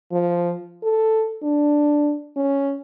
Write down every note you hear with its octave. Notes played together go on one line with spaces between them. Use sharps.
F3
A4
D4
C#4